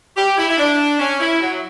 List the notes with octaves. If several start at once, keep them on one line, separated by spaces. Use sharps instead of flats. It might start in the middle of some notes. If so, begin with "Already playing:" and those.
G4
E4
E4
D4
C#4
E4
F#3